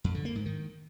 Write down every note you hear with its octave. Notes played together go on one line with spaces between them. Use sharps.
F2
D3
A#3
G#2
D#3